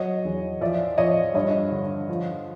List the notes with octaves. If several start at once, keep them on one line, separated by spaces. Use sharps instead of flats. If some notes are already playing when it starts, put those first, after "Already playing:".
Already playing: F#3 C#5 D#5
E2
F3 D5 E5
F3 C#5 D#5
G2 C#5 D#5
D3
F3